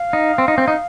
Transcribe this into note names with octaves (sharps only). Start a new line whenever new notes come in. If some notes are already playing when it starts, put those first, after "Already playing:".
Already playing: F5
D#4
C4
D#4
C4
D#4